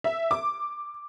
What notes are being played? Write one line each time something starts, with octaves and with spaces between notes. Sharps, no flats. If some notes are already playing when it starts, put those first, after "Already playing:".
E5
D6